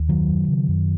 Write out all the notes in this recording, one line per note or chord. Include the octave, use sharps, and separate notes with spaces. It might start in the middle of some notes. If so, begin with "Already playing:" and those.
Already playing: D#2
F#2 D#3 F#3
F#2
C#3
F#2